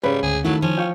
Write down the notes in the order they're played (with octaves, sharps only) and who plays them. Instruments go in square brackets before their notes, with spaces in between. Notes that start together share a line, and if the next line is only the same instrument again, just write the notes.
[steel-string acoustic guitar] G#2 [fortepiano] C#3 C#4 B4 [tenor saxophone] G3
[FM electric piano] D2 [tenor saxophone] G#4
[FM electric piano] D#3 [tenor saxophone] F#3 [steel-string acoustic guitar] A3 E4
[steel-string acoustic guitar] F3 [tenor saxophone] C#4
[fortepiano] F4 [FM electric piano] G5 C#6